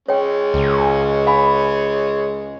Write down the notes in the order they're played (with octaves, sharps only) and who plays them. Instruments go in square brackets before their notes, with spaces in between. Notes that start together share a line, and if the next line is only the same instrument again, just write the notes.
[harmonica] G#3 C#4 [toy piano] C#5 G5
[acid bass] C#2
[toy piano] F5 G#5 B5